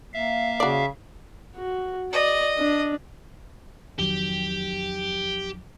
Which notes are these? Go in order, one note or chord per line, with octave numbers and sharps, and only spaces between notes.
A#3 E5 F5
C#3 F#4 D5
F#4
D5 D#5
D4
F2 D#3 F#3 G4